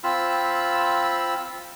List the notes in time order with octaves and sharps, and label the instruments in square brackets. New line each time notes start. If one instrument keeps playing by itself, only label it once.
[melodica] C4 F4 B5 E6